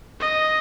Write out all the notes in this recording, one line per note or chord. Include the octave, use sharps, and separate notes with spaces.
D#5